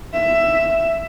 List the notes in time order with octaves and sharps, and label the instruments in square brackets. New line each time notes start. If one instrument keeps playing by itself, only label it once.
[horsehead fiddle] E5